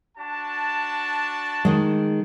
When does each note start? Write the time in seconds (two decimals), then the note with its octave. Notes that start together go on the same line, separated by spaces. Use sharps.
0.17 D4 F#4 A5
1.65 D#3 G#3